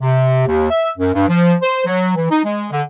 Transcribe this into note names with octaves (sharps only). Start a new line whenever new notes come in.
C3
D#2
E5
F#2
G2
F3
C5
F#3
E3
D#4
G#3
D3